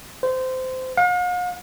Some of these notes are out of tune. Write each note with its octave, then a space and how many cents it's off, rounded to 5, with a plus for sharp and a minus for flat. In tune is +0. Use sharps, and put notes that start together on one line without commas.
C5 -20
F5 +45